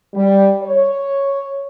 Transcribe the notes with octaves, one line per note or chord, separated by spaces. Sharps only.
G3
C#5